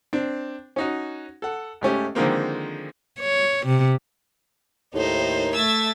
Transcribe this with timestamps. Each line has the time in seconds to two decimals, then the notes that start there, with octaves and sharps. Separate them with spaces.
0.13 C4 D4
0.76 C#4 D#4 F#4
1.42 A4 F#5
1.81 G#2 A3 C#4 G4
2.15 D3 D#3 F3 G#3 A#3 C4
3.19 C#5
3.66 C3
4.94 D#2 A2 D#4 C5
5.55 A3 E5 E6 G#6 A6